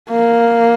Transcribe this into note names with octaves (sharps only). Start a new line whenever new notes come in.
A#3